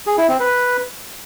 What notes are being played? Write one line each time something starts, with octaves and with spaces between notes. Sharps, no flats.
G#4
E4
C4
B4